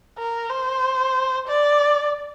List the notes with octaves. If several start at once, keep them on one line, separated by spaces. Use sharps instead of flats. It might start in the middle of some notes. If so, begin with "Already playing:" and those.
A#4
C5
D5